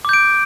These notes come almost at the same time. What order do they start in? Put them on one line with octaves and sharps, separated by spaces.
D6 G6 D7